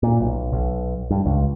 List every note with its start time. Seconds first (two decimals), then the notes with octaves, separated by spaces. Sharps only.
0.03 A#2
0.21 B1
0.52 B1
1.11 G2
1.26 C#2